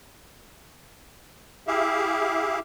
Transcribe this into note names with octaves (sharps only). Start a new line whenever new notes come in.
E4 G4 G#4 E5 F5